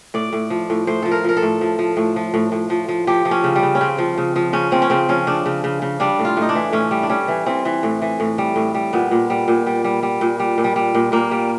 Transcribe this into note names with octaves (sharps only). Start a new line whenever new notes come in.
A2 D5
A2
F3
A2
A2 C5
F3 A4
A#4
F3 A#4
A4
A2
F3
F3
A2
F3
A2
A2
F3
F3
F3 G4
F3
C#4
C#3
G3
C#3
C#4
C#3 C4
F3
C#3
F3
C#3 C#4
F3 C4
C#4
C#3 C4
F3 C#4
C#3 D4
C#3
C#3
C#3
G3 D4
A2
F4
A2 D#4
D4
E3
A2 C#4
G3
D4
G3 C#4
E3
E3 C4
E3
A2
E3
A2
G3
A2
G3
A#2 B3
A#2
G3
A#2
G3
G3
G3
A#2
G3
A#2
G3
G3
A#2
A#2 A#3
G3